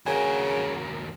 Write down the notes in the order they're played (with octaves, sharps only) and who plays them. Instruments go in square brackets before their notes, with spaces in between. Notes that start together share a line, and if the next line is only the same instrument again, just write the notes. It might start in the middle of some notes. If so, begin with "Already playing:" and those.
[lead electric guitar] D#2 F#4 [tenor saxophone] C#3 [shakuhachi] A#4 [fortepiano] G#5